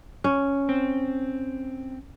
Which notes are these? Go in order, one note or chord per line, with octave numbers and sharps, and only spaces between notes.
C#4
C4